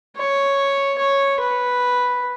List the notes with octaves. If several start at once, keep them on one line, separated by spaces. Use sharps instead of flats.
C#5
C#5
B4